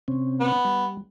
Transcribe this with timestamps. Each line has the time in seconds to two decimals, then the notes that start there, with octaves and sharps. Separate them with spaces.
0.08 C3 C4 C#4
0.40 B3
0.65 G3